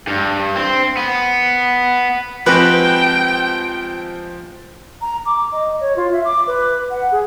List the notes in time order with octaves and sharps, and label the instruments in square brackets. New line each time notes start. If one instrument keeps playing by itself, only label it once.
[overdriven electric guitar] G2
C4
B3
[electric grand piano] F3 C4 [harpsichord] G#3 F#4 G4 [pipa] B4 [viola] G5
[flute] A#5
D6
D#5
C#5
F4
E5
D6
B4
F#5
G#4